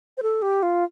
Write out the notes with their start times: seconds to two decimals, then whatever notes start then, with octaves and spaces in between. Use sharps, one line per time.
0.17 C5
0.22 A4
0.42 G4
0.62 F4